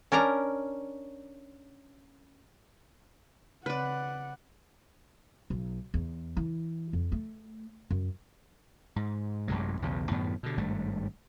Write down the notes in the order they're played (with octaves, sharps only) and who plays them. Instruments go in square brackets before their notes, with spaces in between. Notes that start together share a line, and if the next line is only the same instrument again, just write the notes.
[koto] C#4 D4 A#4 A#5
[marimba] C#3 C4 [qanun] B4 D5 [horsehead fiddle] F#5
[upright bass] B1
E2
E3
F2
A3
F#2
[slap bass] G#2
A1 F#2 C3 G#3
B1 E2 C#3
F#2 A2 D#3 B3
B2 D3
G#1 G2 A3